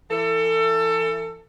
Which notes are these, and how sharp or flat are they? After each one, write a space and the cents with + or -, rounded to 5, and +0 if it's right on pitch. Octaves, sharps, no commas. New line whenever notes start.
E3 +25 A4 +30